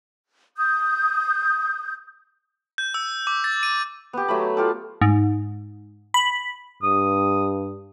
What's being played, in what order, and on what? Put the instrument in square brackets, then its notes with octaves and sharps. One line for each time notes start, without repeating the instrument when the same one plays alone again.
[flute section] D#6 G6
[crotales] G6
E6
D6
A6
D#7
[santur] B3 G4
F#3 A3 B5
F4 G4 A4
[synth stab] G#2
B5
[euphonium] G2 [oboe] D#6